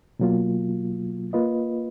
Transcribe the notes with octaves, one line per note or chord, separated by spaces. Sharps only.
B2 F#3 A#3 F4
A#3 F4 B4 D#5